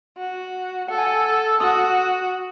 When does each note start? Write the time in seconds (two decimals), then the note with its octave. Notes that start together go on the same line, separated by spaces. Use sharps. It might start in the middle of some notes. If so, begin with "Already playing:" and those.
0.18 F#4
0.88 A4 F#5
0.98 G#5
1.07 F#5
1.25 E6
1.60 F#4 D#6